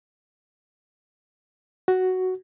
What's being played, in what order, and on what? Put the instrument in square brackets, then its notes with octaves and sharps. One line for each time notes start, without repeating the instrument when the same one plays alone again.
[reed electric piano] F#4